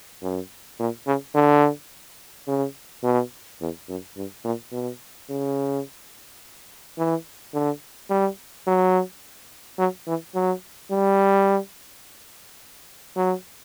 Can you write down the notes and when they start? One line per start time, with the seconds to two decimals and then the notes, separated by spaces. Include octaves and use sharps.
0.22 F#2
0.80 A#2
1.07 C#3
1.35 D3
2.47 C#3
3.03 B2
3.61 E2
3.88 F#2
4.16 G2
4.44 A#2
4.72 B2
5.29 C#3
6.98 E3
7.54 D3
8.10 G3
8.67 F#3
9.78 F#3
10.07 E3
10.35 F#3
10.91 G3
13.16 F#3